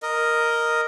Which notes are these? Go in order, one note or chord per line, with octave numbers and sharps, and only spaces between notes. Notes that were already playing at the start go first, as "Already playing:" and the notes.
A#4 D#5